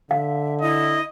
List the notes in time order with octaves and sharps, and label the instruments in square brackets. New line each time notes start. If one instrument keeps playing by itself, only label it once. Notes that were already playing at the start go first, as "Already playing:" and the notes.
[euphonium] D3 [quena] E5 [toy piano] F5
[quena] E4 [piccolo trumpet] D#5